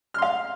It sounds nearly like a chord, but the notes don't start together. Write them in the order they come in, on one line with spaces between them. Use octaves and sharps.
F6 C6 F5